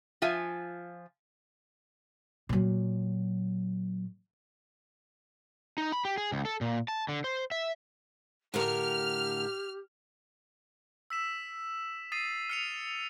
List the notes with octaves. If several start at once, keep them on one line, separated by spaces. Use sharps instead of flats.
F3 F4 E5 G#5
A#2 F#3
D#4
B5
G4
G#4
C#2
A4
A#2
A5
D3
C5
E5
A2 D3 G4 A#4 F6
E6 B6 E7
D#6 A6 C7 D#7
F6 C#7 F7